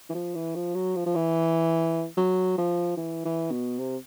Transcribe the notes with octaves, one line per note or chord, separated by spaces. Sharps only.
E3
F3
E3
F3
F#3
F3
F3
E3
F#3
F3
E3
E3
B2
C3